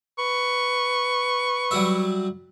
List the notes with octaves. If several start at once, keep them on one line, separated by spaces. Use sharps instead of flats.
B4 C#6
F#3 G3 E5